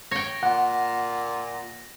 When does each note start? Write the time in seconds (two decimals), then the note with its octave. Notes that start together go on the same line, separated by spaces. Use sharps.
0.11 C#5 G5 A#6
0.43 A#2 F#5